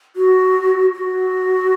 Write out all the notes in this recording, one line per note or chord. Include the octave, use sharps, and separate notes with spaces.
F#4
F#4